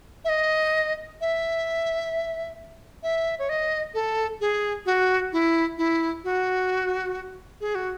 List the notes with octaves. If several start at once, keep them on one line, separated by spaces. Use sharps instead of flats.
E5
D#5
E5
E5
C#5
D#5
A4
G#4
F#4
E4
E4
F#4
G#4
F#4